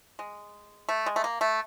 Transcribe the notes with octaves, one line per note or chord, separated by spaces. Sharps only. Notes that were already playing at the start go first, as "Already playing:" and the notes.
G#3
A3
G#3
A3
A#3
A3